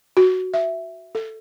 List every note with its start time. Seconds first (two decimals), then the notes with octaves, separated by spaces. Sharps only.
0.17 F#4
0.54 E5
1.15 A4